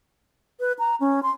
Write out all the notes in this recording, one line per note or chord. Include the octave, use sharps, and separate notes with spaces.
B4
A#5
C#4
C6